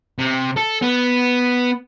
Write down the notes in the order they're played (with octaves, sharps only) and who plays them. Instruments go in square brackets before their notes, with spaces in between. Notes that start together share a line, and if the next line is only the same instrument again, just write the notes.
[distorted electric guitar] C3
A4
B3